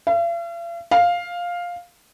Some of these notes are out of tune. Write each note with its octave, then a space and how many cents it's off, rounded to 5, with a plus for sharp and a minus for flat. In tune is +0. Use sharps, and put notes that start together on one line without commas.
F5 -45
F5 +5